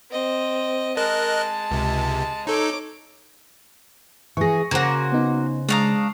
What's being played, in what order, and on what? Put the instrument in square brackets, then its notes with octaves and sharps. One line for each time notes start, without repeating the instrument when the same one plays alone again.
[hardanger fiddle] C4 D#5
[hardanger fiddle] G#3 A5 [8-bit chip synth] A#4 D#5 F#6
[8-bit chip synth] C#2 C3
[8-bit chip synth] D#4 A4 [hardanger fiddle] C#5 D6
[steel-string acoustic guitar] E3 G#4 [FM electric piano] C#6 A#6
[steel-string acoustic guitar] C#3 C5 [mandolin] A#3 F#4
[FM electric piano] B3 D#4
[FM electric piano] G#3 C#6 D#6 [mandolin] D4 F5 A#5